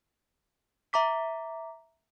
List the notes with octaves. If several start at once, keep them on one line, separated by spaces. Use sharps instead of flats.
E5 A#5 D6 B6